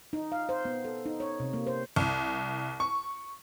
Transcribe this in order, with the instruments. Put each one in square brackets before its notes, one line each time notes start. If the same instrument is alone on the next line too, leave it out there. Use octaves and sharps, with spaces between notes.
[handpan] D#4
F5
C5
B3
A4
D#4
C#5
C3
A#3
C5
[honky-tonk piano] C2
C#6